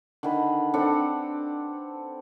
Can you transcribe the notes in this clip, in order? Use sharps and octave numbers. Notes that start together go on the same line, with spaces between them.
D3 D#3 B4
C4 D4 A4 F#5